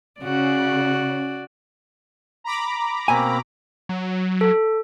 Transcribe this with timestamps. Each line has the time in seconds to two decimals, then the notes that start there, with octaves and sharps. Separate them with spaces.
0.22 C#3 F#4 D5
2.44 A#5 B5 D6
3.08 B2 A#3 C4 G#5
3.89 F#3
4.41 A4